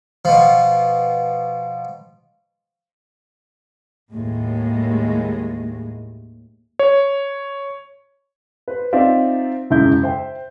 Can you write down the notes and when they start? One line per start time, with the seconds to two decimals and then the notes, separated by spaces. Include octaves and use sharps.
0.25 B2 F3
4.12 D#2 A2 G#3
6.79 C#5
8.68 B4 C5
8.93 C4 D#4 F4 D5 E5
9.70 E1 F#2 C#3 E4 G6
10.03 C5 E5 G5